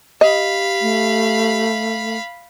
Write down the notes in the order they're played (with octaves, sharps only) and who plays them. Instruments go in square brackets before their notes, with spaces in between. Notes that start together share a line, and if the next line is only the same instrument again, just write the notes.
[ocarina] G4 [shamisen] D#5 [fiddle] F5 B5
[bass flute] A3